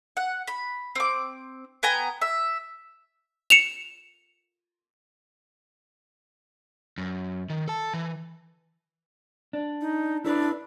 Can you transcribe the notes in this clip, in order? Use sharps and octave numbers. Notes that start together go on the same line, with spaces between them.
F#5
B5
C4 D6
B3 G5 G#5 A#5
E5
C#7 E7 F7
F#2
D#3
A4 A5
E3
D4
D#4
D4 E4 A4 B4